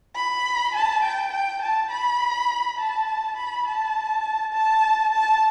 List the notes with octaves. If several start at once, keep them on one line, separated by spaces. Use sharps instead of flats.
B5
A5
G5
G5
A5
B5
A5
B5
A5
A5
A5